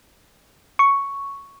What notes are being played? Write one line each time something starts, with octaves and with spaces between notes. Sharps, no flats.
C#6